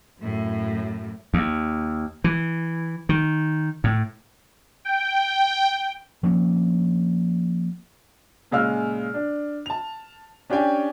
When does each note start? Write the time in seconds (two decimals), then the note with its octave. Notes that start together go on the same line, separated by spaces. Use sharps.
0.20 F#2 A2
1.34 D#2
2.24 E3
3.09 D#3
3.84 A2
4.85 G5
6.23 F3 A#3 C4 C#4
8.51 A#2 C#3 G#3 F5 E6 F6
9.14 D4
9.66 A5 F7
10.50 C#4 D4 G4 C#5 G5 G#5